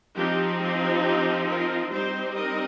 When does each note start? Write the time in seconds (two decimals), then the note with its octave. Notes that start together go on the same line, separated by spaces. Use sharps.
0.16 F3 C4 D#4 G4
0.60 G4
1.04 G4
1.48 F4 A#4
1.91 G3 C4 D#4 G4 C5
2.35 A#4 D#5